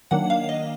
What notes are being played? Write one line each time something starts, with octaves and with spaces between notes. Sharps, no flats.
D#3 F#3 A#3 D4 F#5
F5
D#5